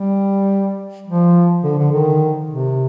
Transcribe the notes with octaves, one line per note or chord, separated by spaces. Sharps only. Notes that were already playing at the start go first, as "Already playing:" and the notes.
Already playing: G3
F3
D3
D3
D#3
C3